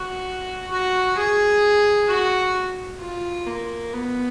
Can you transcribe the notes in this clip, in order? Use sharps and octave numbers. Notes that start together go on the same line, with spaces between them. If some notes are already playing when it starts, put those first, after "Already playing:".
Already playing: F#4
F#4
G#4
F#4
F4
A#3
B3